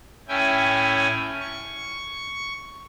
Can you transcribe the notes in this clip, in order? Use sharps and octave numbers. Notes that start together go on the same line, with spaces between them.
A2 C#4 E4 G5 G#5
C#6